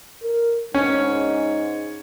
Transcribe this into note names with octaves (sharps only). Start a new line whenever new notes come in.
A#4
G#2 C#4